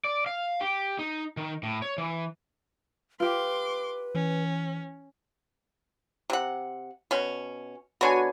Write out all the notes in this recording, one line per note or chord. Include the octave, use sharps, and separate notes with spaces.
D5
F5
G4
D#4
D#3
A2
C#5
E3
F4 G4 B4 C6 D6
E3 C#4
C3 F#5
B2 C#4
D3 B3 F#4 C#5 G#5